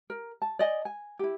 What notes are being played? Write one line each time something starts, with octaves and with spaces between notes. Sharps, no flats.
A#4
A5
D5 D#5 G#5
G#5
E4 G4